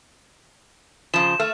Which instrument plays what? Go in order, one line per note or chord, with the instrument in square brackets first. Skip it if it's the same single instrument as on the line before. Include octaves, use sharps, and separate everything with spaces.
[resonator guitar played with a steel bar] C#3 F3 [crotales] E7
[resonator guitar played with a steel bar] A3 [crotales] F6